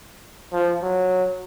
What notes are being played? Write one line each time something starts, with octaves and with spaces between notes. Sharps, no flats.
F3
F#3